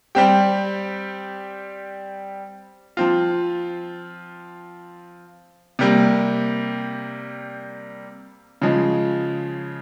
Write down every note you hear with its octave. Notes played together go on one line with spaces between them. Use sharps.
G3 C4 G4
F3 C4 F4
C3 G3 A#3
C#3 F3 G#3